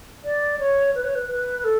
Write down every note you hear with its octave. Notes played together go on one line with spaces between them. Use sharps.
D5
C#5
B4
C#5
B4
B4
A4